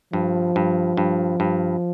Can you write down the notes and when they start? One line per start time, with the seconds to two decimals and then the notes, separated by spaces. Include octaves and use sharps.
0.13 G2 F3
0.56 G2
0.97 G2
1.40 G2